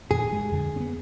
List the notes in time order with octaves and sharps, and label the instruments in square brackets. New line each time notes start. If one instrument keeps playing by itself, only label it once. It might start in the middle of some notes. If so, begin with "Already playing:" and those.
[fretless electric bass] F2 A#2 D#3 [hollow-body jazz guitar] G#4
[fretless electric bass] G#3
F2 D3
B3 C4